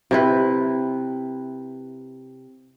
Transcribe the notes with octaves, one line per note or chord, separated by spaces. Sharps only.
C3 E4 B4